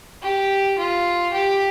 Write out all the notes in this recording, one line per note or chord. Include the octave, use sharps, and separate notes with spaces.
G4
F4
G4